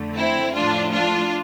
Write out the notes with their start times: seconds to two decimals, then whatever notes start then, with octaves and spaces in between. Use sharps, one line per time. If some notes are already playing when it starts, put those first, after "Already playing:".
Already playing: F2 D3 A3
0.16 C4 E4
0.55 A2 F3 A3 D4 F4
0.92 D4 F4